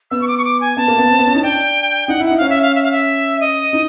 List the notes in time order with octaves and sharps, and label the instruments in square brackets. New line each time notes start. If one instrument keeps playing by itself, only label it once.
[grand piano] B3 [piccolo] E6
[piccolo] C#6
D6
C#6
D6
G#5
[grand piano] B3 [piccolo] A5
[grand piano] A#3
B3
C4
B3
C#4
D#4
[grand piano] D4 [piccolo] G5
[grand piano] D#4 [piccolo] F#5
[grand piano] E4
[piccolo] F#5
[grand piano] D#4
[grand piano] C#4 [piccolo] F5
[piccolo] E5
F5
E5
F5
E5
D#5
[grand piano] D#4